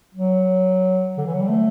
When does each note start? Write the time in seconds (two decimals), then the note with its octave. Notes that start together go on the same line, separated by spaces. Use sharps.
0.14 F#3
1.18 D3
1.26 E3
1.34 F#3
1.41 G3
1.49 A3